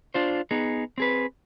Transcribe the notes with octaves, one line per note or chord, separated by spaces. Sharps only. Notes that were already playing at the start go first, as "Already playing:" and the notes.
D4 F4 C5
B3 D#4 G#4
C4 G#4 B4